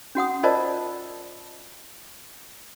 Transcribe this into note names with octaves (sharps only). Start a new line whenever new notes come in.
C#4 F#4 F#5 D#6
F4 A#4 C5 D5 D#5 A5